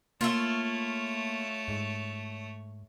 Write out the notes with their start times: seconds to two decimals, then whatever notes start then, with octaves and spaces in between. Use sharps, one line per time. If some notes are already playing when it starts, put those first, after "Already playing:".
0.21 A3 A#3 E4 F4 C#5
1.68 G#2